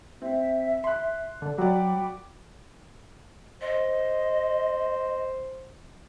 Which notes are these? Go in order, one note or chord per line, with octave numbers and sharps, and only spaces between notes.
C4 E5
C6 F#6
D3
F#3 F#4 D5 G5 B5 D6
C5 D#5